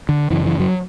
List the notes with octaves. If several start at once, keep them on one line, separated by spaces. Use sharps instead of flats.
D3
F#2 C#3 E3
E3
F#3